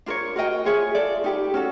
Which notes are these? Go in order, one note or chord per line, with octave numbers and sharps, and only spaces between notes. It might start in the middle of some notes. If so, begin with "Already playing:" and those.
D4 F4 A#4 C#5
F#4 A#4 D#5 G5
F4 G#4 C#5 E5
F4 A4 D5
D#4 G4 B4
C#4 F#4 A4